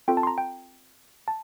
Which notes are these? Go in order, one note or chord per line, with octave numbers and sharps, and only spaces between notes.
C4 F4 A4 G5
A5
C6
A#5
G5
A5